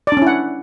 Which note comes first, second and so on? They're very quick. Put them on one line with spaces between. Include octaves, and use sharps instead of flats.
D5 D4 C#4 E4 F#5